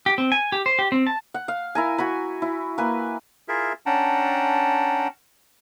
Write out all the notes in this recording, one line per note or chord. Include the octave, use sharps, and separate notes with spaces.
G4
C4
G#5
G4
C5
G4
C4
A5
F#5
F5
E4 A#4 G#5
F#4 G#5 B5
E4
A#3 B4 G#5
E4 F4 G#4 A#4 E5
C#4 D4 F#5 G5 A5 A#5